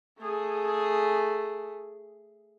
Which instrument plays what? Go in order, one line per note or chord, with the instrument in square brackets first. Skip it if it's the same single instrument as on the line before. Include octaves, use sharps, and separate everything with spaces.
[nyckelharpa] A3 G#4